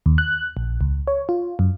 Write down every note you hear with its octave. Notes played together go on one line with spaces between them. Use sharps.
D#2
F#6
A#1
C#2
C#5
F4
F#2